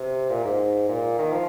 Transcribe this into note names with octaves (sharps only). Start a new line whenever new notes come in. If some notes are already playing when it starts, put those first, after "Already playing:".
Already playing: C3
A#2
G#2
A#2
D#3
F3